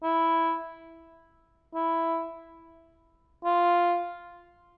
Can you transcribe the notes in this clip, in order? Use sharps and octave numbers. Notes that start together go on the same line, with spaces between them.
E4
E4
F4